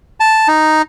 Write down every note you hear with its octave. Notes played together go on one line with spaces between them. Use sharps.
A5
D#4